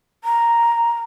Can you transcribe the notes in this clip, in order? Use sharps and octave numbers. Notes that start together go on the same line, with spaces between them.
A#5